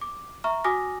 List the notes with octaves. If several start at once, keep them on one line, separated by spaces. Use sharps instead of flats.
D6
E5 A#5 C#6 F6
F#4 G#5 D6 D#6 F6 A#6